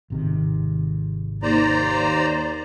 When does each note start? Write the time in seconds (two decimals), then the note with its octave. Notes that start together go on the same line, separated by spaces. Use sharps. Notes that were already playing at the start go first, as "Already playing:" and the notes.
0.10 G#1 C3 D#3
1.43 D#2 C5 D5 A#5